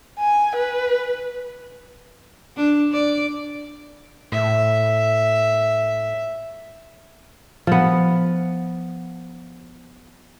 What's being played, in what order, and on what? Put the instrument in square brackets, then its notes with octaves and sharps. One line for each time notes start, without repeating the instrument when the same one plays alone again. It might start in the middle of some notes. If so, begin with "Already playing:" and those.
[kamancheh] G#5
B4
[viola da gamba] D4
D5
[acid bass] A2 [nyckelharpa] E5
[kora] F3 B3